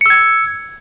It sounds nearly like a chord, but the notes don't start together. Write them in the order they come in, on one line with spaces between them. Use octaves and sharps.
C#7 E6 G#6